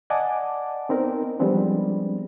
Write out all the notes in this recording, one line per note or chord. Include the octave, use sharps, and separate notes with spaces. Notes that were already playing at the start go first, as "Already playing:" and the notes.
D5 D#5 F#5 G#5 A5 D6
B3 C4 D#4 A#4
F3 G3 G#3 B3 C4 D4